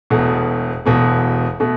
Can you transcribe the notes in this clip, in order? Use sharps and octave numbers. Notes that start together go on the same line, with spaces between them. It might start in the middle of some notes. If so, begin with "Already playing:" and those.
E1 E2 B2 A3
E1 E2 B2 A3
B2 A3